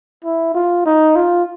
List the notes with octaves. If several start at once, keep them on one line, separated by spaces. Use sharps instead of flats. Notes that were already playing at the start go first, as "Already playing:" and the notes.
E4
F4
D#4
F4